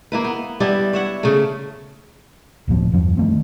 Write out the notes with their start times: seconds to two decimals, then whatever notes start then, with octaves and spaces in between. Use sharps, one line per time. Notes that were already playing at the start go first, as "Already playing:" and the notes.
0.12 A#3 E4 B4
0.25 B3
0.60 G3 B3 D4 E4
0.93 C#5 E5 F#5
1.23 C#3 A3
2.68 D1 A2 F3 C4
2.92 E2 G2 F3 C#4
3.17 D#3 A3 C4